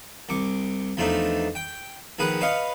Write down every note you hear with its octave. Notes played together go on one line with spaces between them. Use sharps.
C2 C#6 D6
E2 F3 A3 D4 D#4
G5
A#1 D#3 G#4 B4 F#5 D#6
B4 C#5 D#5 F5 C#6